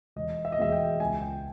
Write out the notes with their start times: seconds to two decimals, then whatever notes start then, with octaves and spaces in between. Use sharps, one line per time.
0.16 E1 D#5
0.45 E5
0.52 D#5
0.58 E2 B2 G#3 B3 E5
0.72 G5
1.00 C#2 G#5
1.22 G5